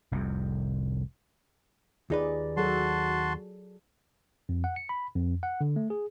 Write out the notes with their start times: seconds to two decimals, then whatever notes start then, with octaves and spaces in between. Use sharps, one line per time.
0.12 F1 C2 F2 C3
2.10 D#2 D#4 F4 G#4 B4 D5
2.57 F#3 F#4 G#4 A4 A5 C6
4.49 F2
4.64 F#5
4.76 C#7
4.89 B5
5.15 F2
5.43 F#5
5.61 D3
5.76 A3
5.90 G#4